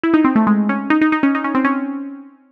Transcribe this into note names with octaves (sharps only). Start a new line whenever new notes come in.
E4
D#4
C4
A3
G#3
C#4
D#4
D#4
D#4
C#4
D#4
C#4
C4
C#4